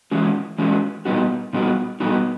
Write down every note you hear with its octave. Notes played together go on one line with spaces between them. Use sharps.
E3 G#3 C#4 F#4
E3 G#3 C#4 F#4
A#2 G3 B3 D#4 F#4
A#2 G3 B3 D#4 F#4
A#2 G3 B3 D#4 F#4